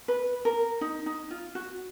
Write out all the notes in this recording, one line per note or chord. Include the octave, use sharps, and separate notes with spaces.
B4
A#4
D#4
D#4
F4
F#4